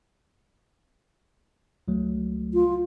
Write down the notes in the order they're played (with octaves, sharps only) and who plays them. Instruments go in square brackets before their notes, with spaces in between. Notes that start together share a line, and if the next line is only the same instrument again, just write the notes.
[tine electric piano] C#2 F#3 A3
[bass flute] F4